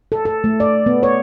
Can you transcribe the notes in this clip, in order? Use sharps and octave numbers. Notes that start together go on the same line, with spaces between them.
A4
A4
A3
D5
B3
C#5